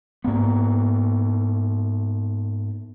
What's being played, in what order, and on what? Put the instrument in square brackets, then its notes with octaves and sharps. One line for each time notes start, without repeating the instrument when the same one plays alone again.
[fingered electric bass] G#2 A#3 B3